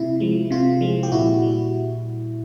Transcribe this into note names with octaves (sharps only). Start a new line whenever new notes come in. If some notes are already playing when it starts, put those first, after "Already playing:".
Already playing: C3 E4
F3 G#3
C3 F4
F3 G#3
G4
A#2 E4 F#4
G3